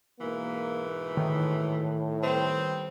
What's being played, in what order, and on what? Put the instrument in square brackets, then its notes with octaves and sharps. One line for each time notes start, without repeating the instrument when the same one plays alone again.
[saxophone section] G#2 B2 E3 [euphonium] A#3
[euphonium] A2 [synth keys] D#3
[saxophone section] G3 B3 C4